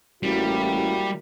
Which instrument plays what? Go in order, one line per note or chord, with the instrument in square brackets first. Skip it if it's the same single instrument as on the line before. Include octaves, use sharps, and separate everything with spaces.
[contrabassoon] A1 [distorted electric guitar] G3 [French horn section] A#3 E4 F#4